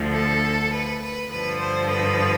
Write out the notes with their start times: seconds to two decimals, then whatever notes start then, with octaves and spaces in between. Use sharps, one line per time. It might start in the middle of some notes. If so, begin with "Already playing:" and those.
Already playing: D2 D3 F3
0.13 A4
0.73 B4
1.02 B4
1.30 G2 D3 F3 B4
1.59 C5
1.89 B4